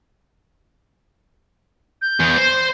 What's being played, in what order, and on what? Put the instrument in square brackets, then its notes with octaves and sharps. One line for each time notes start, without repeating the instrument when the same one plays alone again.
[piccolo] G6
[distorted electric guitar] E2
C5